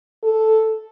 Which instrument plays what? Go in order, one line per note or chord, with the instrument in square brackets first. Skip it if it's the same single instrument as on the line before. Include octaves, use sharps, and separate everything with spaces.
[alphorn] A4